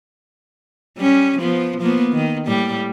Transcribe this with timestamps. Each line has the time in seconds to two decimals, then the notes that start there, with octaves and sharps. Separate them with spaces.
0.97 G3 C#4
1.39 F3 B3
1.81 F3 A#3 B3
2.13 D#3
2.46 A2 G3 A#3